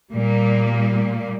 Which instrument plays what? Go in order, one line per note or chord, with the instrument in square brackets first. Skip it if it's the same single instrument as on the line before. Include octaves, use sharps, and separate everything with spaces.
[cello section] A#2 G3 A#3